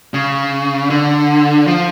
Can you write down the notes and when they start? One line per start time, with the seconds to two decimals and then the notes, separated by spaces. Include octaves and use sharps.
0.14 C#3
0.90 D3
1.67 F3